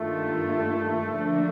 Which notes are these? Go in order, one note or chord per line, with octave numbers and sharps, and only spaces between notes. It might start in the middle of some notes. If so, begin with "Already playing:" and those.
Already playing: G2 D#3 A3 A#3 F4
D3 F3 A#3 D4